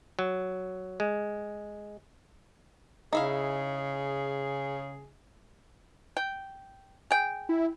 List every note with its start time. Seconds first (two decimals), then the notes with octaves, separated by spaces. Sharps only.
0.19 F#3
1.00 G#3
3.13 C#3 D#4 E4 G#4 F5
6.17 G5
7.11 G#4 G5
7.49 E4